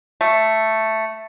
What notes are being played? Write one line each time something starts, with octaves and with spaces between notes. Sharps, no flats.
A3